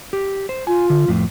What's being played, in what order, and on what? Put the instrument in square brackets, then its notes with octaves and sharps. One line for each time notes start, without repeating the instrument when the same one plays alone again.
[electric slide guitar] G4
C5
[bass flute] F4 [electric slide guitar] G#5
[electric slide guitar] D3
F2 A2